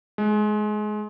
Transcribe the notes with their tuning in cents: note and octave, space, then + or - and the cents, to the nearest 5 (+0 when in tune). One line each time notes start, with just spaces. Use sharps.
G#3 +25